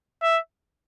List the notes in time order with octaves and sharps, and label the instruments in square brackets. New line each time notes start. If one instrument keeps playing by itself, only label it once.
[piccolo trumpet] E5